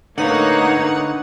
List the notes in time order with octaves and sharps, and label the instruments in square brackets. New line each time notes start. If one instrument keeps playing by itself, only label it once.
[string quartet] A2 A#3 C#5 [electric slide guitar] D3 B4 F5 [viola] D#4 [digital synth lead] F#5